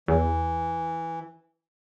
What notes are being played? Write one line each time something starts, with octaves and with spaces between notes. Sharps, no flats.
E2 E3